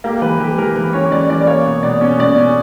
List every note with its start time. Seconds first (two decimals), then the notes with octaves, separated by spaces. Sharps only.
0.04 A#3 G4
0.22 E3 B4
0.39 E3 G4
0.58 E3 A#4
0.76 E3 B4
0.93 C#4 C#5
1.11 E3 D5
1.29 E3 D5
1.41 D5
1.47 A#3 C#5
1.66 B2
1.83 B2 D5
2.01 C#4
2.19 B2 D5
2.38 C#4